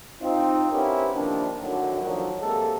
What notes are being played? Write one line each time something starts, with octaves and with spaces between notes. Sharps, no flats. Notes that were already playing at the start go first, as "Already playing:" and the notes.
C4 D#4 F4
B3 C#4 E4 G4 A#4 C5
C3 D#3 F3 A#3 D4
F#2 A2 D3 D#3 F#3
D3 D#3 F3 F#3
C3 G#3 A#3 A4